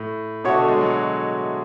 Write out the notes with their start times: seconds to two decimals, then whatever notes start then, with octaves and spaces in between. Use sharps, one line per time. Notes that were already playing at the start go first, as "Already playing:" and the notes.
Already playing: A2
0.44 B2 A3 D4 F#4 C#5
0.56 D3
0.68 G#3
0.81 F#3